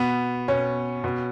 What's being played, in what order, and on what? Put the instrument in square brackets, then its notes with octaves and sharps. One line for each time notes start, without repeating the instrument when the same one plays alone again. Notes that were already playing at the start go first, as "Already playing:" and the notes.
Already playing: [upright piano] B2 B3
B2 C#4
B2